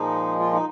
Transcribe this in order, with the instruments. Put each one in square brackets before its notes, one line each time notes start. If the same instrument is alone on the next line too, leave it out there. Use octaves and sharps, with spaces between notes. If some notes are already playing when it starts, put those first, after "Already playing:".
Already playing: [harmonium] A#2 F3 G#3 D#4
F4
D#4